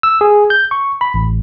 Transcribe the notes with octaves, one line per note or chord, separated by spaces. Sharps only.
E6
G#4
G6
C#6
B5
A1